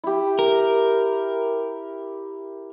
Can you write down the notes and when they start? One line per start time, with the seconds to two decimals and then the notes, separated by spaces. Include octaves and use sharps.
0.04 E4 G4
0.39 A#4